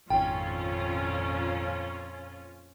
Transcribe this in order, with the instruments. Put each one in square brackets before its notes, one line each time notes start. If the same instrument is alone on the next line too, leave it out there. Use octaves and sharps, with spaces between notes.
[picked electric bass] G#1 [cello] F2 A#2 [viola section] C#4 F4 [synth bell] G5